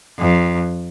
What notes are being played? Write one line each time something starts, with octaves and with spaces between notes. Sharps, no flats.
F2